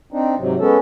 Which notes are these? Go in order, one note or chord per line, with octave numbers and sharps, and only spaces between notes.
C4 D4 D#4
G#2 C3 F#3
G#3 B3 C#4 A4